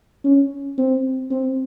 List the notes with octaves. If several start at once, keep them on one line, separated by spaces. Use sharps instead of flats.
C#4
C4
C4